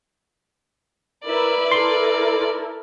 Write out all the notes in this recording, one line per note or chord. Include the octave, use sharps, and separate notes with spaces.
E4 A#4 B4 D5 E5
E4 A4 A#4 C6